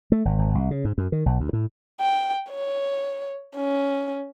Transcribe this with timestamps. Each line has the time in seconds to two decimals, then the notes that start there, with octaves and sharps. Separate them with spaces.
0.12 A3
0.25 G#1
0.39 G#1
0.55 C2
0.71 C#3
0.85 G#2
0.98 F#2
1.12 D#3
1.26 B1
1.40 D2
1.53 A2
2.00 G5
2.51 C#5
3.56 C#4